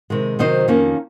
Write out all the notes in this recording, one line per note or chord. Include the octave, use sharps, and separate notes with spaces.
C3 D#3 G#3
C3 D#3 F#3 C4 C5 D#5
F2 D#3 A#3 C#4